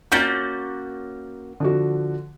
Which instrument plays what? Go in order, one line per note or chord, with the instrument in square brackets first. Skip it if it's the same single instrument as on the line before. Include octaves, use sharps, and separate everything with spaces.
[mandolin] A#3 C#4 F#4 [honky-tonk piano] G6 A6
[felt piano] D3 F3 F#4